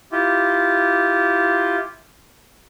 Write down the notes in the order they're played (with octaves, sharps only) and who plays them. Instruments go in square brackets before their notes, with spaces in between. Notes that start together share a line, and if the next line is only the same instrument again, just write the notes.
[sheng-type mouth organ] E4 F4 G4